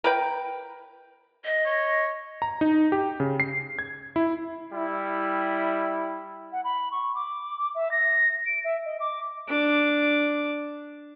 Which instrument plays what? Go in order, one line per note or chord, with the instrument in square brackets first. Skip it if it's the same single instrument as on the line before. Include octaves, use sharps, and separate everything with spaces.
[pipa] A#4 B4 G5
[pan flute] D#5
[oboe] C#5
[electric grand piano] A#5
D#4
G4
C#3
C7
G#6
E4
[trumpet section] G3 E4
[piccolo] F#5
B5
C#6
D6
E5
A#6
D7
E5
D#5
D6
[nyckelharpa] D4 D6